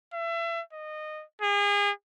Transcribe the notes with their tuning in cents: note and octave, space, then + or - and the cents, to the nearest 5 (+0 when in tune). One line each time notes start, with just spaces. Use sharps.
E5 +30
D#5 -20
G#4 -35